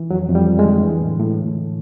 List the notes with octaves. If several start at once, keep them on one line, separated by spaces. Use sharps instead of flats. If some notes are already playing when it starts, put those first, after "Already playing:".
Already playing: E3
F2 F#3
F2
G3
F3
G#3
D3
E3
A2
A2